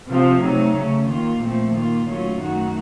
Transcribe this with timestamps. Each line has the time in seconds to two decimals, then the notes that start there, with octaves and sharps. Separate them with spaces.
0.09 C3 F3 C4 F4
0.42 C3 F#3 A3 D#4
0.75 C#3 A3 C#4
1.08 D#3 A#3 F4
1.40 A#2 F3 A3 C4
1.73 D#3 A#3 F4
2.06 D#3 F#3 A3 C#4 F4
2.39 F#2 D#3 A3 D#4 F#4